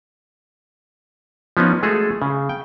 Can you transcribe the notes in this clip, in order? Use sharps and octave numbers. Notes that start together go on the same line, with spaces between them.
F3 B3 C#4 D#4
G#3 A3 F#4 G#4 A4
C#3
G5